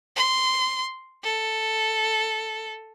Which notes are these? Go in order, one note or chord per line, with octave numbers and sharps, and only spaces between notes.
C6
A4